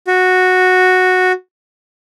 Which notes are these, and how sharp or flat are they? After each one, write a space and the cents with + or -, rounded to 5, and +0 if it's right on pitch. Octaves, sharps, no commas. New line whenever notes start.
F#4 -5